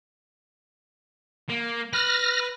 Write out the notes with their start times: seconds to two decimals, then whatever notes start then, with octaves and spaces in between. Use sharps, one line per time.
1.49 A#3
1.93 B4 F6 A#6